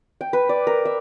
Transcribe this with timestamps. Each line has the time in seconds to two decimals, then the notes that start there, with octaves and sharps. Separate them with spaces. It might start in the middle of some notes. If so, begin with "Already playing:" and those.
0.21 G5
0.33 B4
0.49 D5
0.67 A#4
0.85 E5